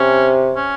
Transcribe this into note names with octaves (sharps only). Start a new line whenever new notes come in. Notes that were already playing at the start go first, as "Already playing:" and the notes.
Already playing: C3 C#4
C#4